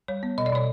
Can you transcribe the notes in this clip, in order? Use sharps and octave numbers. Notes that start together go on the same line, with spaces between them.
G3 C#5
B3
B2 D#5
D5
B2 C#5